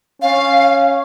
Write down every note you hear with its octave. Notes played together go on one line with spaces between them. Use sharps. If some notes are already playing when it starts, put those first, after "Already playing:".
C#4 F5